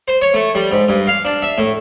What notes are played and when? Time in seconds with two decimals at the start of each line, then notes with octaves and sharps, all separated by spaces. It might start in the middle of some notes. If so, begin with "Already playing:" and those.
0.08 C5
0.22 C#5
0.34 A3
0.55 G3
0.72 G#2
0.88 G2
1.07 F5
1.25 D4
1.42 E5
1.58 A2